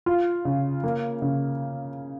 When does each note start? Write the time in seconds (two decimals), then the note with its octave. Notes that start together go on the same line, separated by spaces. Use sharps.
0.06 F4
0.45 C#3
0.84 A#3
1.22 C#3